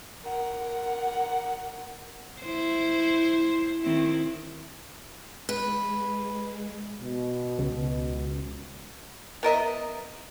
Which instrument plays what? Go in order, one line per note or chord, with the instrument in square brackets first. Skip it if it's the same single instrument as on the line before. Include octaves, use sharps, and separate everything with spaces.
[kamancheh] A#4 F#5
[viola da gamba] E4 C5
D#3 C4 E4
[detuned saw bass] G#3 [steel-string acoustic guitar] B4
[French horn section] B2
[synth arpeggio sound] C#2
[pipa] B3 A#4 D#5 E5